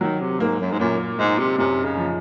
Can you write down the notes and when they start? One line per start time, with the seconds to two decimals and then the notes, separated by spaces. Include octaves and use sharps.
0.01 D#3 F#3
0.21 C3
0.40 G#2 A#3
0.60 F#2
0.72 G#2
0.80 F#2 A#2
1.19 G#2 D#4
1.39 C3
1.58 F#2 C3
1.84 C#3
1.97 F3